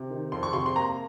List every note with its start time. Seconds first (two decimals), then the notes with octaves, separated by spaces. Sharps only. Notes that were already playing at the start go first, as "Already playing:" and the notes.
Already playing: C3
0.10 D#3
0.32 F2 C6
0.43 C#6
0.53 C3 C6
0.66 C6
0.76 A#3 A#5